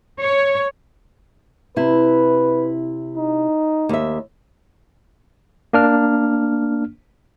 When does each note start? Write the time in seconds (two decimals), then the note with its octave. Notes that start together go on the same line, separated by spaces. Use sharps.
0.19 C#5
1.76 C3 E4 B4
3.17 D#4
3.89 D#2 E5
5.73 A#3 D4 F6